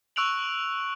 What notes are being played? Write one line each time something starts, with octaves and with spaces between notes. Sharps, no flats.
C#6 E6 F#6 D7 F7 F#7